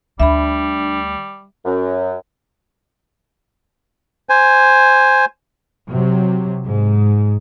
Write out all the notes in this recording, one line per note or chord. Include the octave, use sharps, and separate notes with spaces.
D2 G3 D4 E5 B5
F#2
C5 G#5
C3 F#3
G#2